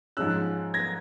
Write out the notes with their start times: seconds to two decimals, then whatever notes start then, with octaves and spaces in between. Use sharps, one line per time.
0.17 G#2 F3 G#3 C#4 E6 F#6
0.74 G#6 A#6